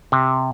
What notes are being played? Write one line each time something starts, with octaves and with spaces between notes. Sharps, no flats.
C3